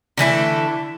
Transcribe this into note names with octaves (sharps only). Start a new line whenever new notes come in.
D3 E3 A3 E4